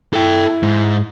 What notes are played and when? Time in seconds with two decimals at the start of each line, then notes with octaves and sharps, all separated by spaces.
0.13 E4 A4 G5
0.63 G#2